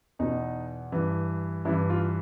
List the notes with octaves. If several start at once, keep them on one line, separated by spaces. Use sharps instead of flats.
E2 B2 D#4
G2 E3
G2 E3 E4
F4